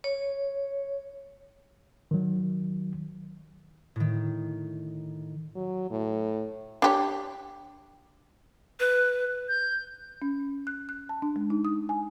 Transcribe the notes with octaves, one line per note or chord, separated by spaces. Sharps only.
C#5
D#3 F#3
A2 D#3
F#3
A2
D4 G4 C#5
B4
G6
C#4
F#6
F#6
A5
D4
G#3
D#4
D#6
G#5